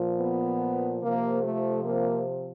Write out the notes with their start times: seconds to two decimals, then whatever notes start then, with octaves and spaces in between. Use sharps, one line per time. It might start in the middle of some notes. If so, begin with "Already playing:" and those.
Already playing: A#2 F3
0.21 B3
1.02 C3 F3 A#3
1.44 A3
1.85 A#3